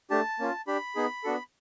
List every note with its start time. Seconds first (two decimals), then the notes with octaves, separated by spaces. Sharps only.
0.10 A3 D4 G4 A5
0.39 A#3 C#4 F4
0.67 D4 G4 B5
0.95 B3 D#4 G#4
1.24 B3 D4 F#4 A4